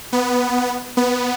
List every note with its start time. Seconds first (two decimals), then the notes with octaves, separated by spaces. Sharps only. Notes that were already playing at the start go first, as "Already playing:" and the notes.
0.13 B3
0.97 B3